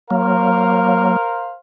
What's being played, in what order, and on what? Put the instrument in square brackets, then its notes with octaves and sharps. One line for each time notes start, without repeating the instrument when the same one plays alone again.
[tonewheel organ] F#3 A#3 [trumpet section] A#4 C5 F5